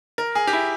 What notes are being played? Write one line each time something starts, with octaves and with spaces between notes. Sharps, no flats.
A#4
G#4
G4
E4